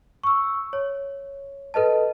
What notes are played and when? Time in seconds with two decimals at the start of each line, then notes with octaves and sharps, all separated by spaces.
0.24 C#6 E6
0.73 C#5
1.74 A4 B4 D#5 A5